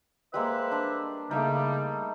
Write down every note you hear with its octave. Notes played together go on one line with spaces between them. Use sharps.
G3 G#3 A#3 B4 C5 E5
D4
C#3 G3 A3 A#3 D#4